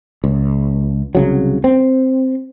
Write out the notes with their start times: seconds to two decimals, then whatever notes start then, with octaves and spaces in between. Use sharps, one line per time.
0.24 C#2
1.15 C2 C#3 F#3
1.64 C4